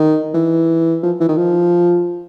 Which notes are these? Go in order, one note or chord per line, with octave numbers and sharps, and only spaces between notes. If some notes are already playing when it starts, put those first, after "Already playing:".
Already playing: D#3
E3
F3
E3
D#3
F3